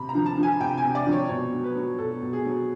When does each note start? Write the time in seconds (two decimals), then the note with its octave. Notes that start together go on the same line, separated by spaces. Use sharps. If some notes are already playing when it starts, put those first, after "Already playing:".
Already playing: C3 B5
0.09 A#5
0.15 F3
0.26 A5
0.37 F3
0.43 G#5
0.61 C3 G5
0.78 G#5
0.84 C3
0.95 D5
1.07 F3
1.12 C#5
1.29 B2 C#5
1.52 F#3
1.64 B4
1.76 F#3
1.98 B2 A4
2.22 B2
2.33 G#4
2.45 F#3